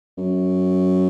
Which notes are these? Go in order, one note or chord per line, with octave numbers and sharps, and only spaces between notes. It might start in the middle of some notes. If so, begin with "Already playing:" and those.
F#2